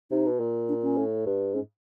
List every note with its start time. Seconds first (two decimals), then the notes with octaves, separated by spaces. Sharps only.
0.11 C3 D#4
0.26 B2
0.40 A#2
0.69 D4
0.83 C#4
0.97 A2
1.26 G2
1.54 G#2 C#4